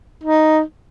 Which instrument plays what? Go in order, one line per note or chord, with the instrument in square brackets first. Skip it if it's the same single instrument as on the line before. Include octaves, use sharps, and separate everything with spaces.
[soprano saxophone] D#4